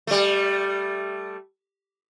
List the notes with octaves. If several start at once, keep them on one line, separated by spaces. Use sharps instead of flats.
G3 A3